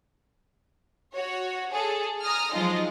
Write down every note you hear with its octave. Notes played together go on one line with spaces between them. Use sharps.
F#4 C#5
G#4 A4
G#5 A#5 D#6 F6
F3 F#3 G#3 D#4 F4 D#5